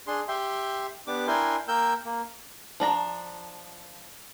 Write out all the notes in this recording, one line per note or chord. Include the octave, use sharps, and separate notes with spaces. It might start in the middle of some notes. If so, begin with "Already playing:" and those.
D4 G#4 C6
G4 E5 G5 C6
B3 D4 G4 D6
D4 E4 A#4 G5 G#5 C6
A#3 A#4 G5 E6 G6
A#3
F3 D4 A#5